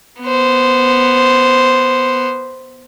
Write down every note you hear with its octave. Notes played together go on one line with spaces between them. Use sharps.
B3 C5